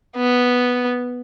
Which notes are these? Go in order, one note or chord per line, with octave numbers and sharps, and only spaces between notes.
B3